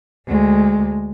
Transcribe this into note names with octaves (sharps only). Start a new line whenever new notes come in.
D2 G#3